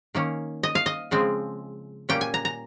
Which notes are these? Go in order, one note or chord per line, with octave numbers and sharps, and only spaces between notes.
D#3 A#3 C#4
D#5
F5
D#5
C#3 F3 G#3 C4
A#2 G3 A#3 C#4 G5
G#5
A#5
A#5